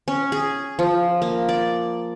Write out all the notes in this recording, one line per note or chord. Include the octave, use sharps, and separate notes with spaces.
C#4
G#4
F3
A#3
D5